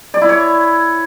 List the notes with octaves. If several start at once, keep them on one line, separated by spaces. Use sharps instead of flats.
D5
E4
C#5